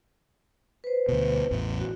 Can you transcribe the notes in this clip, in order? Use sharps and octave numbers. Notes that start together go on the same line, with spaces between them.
B4 C5
D2 B2
A1 E2 A2
F#4